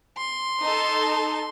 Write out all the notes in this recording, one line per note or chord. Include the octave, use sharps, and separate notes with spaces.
C6
D#4 A4